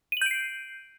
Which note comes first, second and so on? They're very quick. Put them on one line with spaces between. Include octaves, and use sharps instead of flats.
D#7 F#7 G6 D7 C7